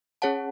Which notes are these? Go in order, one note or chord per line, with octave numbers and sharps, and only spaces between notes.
C#4 G#4 C#5 F#5 A5